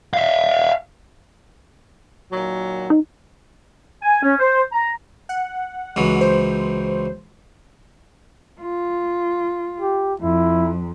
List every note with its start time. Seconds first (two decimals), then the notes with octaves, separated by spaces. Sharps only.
0.14 E5 F5
2.32 A#2 D#3 F#3
2.90 D#4
4.02 G#5
4.23 C#4
4.39 C5
4.72 A#5
5.29 F#5
5.96 C#2 E3 F#3
6.21 C5
8.61 F4
9.80 G4
10.21 F2 E4